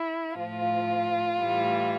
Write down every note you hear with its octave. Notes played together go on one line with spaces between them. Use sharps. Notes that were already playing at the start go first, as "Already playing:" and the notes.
Already playing: E4
A2 F3 F4
A2 E3 G3